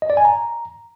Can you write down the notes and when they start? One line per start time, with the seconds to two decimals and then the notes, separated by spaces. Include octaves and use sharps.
0.02 D#5
0.10 D5
0.17 G#5
0.25 A#5